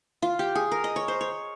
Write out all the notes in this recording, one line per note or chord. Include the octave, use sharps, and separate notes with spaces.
F4
G4
G#4
A#4
D#5
C#5
C5
C#5